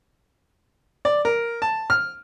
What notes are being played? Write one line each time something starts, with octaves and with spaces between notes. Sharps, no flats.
D5
A#4
A5
F6